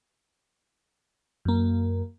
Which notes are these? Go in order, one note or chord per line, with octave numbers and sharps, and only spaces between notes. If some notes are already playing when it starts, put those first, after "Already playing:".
F#2 A#3